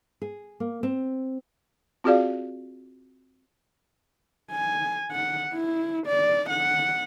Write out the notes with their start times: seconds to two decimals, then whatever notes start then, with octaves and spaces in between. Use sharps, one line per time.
0.22 G#4
0.60 A#3
0.83 C4
2.04 C4 F4 F#4 G#4 D5 F5
4.51 G#5
5.12 F#5
5.54 E4
6.07 D5
6.49 F#5